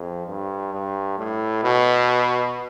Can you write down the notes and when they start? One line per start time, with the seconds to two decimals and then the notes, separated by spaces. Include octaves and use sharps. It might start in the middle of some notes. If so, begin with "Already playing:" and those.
Already playing: F2
0.27 G2
0.73 G2
1.18 A2
1.63 B2